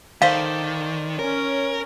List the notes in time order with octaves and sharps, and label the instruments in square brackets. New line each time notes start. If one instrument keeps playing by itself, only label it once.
[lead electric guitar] D#3 [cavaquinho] A4 C5 D5 [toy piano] F5
[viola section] C#4 [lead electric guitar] A#4